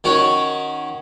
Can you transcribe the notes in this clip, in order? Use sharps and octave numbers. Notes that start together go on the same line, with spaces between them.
D#3 C#4 F#4 C#5